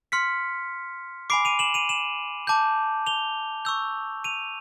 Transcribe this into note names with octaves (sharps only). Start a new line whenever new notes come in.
C6 F6 B6 C#7
G#5 B5 D6 C7 D7
D#7 F7
E7 F#7
D#7 F7
E7 F#7
A5 D6 G6
F7 G7
C#6 E6 G6
D#7 F7